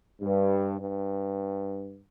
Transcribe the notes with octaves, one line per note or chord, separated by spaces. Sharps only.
G2
G2